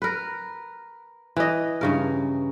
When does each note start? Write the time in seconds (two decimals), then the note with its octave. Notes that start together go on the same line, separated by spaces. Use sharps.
0.02 A#4 B4
1.36 E3 D#5
1.81 G2 C#3 A#4